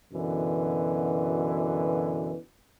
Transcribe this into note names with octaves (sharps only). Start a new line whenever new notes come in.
F#2 B2 D3 E3